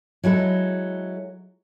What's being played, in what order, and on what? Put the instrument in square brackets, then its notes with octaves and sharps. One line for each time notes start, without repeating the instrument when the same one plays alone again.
[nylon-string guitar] F#3 G#3 E4 A4